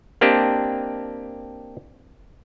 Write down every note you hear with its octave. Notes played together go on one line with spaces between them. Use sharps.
A#3 C4 D4 G4 D#5 A5